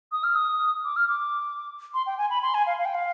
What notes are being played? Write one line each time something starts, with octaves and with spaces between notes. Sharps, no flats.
D#6
F6
D#6
D6
F6
D6
C6
G5
G#5
B5
C6
G#5
F5
F5
G5
F5